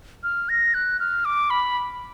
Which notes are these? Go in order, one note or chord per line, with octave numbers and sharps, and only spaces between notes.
F6
A#6
F#6
F6
D6
B5